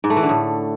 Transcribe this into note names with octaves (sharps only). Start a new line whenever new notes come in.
G#2
A3
E3
D3
A2